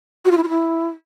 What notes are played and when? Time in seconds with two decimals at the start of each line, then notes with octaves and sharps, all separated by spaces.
0.25 F#4
0.31 F4
0.37 E4
0.43 F4
0.49 E4